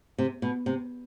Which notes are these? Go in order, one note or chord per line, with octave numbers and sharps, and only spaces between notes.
C3
B2
C3